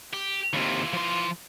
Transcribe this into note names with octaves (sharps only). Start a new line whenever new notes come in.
G4
D#2 C3 E3 F4
F3 C6